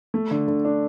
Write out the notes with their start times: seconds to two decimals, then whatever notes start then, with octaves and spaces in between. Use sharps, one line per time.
0.14 A3
0.31 D3
0.48 D3
0.65 D4